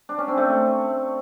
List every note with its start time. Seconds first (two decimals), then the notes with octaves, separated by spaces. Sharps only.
0.09 D4
0.18 C#4
0.28 C4
0.37 A3